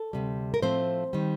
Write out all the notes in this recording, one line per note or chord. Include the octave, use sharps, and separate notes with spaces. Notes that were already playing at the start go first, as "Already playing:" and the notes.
Already playing: A4
D2 C3 G3
A#4
A2 F3 A3 C4 C5
D#3 G3